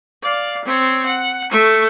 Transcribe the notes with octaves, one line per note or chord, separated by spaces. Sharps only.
D5 F5
C4 C#5
F#5
A3 C#6